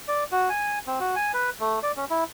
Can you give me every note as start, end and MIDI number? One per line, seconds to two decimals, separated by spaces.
0.08 0.24 74
0.32 0.49 66
0.49 0.79 80
0.87 0.99 60
1.00 1.15 66
1.16 1.32 80
1.34 1.50 71
1.60 1.79 57
1.83 1.92 74
1.97 2.05 61
2.10 2.24 64